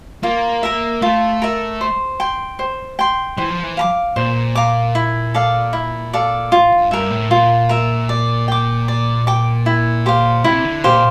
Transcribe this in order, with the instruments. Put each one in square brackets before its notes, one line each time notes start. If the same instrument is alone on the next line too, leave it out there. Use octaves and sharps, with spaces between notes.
[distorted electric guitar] A#3 [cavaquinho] F4
[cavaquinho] A#4 E5
[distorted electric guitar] A3 [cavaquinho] F4
[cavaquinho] A#4 E5
C5
G5 C6
C5
G5 C6
[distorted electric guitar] E3 [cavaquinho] C5
[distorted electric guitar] F3
E3
[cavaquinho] F5 A#5 D6
[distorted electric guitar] A#2 [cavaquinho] C5
[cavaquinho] F5 A#5 D6
E4
A4 D5 F5
E4
A4 D5 F5
[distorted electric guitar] A2 [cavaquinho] F4
[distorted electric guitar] G2
[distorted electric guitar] G2 [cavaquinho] A#4 E5
[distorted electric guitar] A2
[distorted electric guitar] A#2 [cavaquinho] F4
[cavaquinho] A#4 E5
D5
G5 D6
D5
G5 D6
E4
G4 C5 F5
[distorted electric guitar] C3 [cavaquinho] E4
[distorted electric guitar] D3
[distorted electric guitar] A#2 [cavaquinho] G4 C5 F5